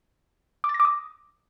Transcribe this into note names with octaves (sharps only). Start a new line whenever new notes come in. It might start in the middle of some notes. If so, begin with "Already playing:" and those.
D6
A6
A#6
D6
D#6